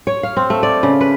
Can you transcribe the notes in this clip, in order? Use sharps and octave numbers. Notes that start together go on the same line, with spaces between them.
C#5
F5
C4
A3
D5
C#3
B4